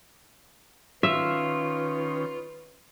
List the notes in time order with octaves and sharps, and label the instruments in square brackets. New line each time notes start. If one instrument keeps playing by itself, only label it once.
[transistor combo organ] D#3 C#4 [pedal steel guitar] F4 [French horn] B4 [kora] E5